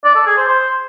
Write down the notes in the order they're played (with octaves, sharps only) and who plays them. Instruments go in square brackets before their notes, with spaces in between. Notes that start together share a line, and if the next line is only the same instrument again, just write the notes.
[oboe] D5
A4
G#4
C5
C5